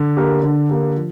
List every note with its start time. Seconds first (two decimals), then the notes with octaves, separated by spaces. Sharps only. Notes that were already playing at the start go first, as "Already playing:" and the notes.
Already playing: D3
0.17 A#3 G4 A#4
0.43 D3
0.69 A#3 G4 A#4
0.96 F3